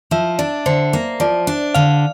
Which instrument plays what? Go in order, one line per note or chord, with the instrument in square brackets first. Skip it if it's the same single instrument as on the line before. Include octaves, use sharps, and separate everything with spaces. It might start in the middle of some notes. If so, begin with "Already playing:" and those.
[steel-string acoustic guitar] F3 [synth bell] E5
[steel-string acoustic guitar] D4 [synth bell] D5
[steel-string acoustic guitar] D3 [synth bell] C5
[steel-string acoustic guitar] A#3
[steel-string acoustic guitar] F3 [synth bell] D5
[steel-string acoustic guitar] D4
[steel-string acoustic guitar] D3 [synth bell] F5